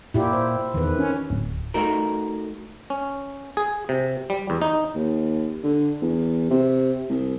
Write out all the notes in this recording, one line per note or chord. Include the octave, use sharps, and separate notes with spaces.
A#2 E4 G4
C5
E2 D#3 B4
C#4
D1
A3 D#4 F#4 A#4
C#4
G#4
C3
G3
E2
D#4
D#2
D3
E2
C3
C2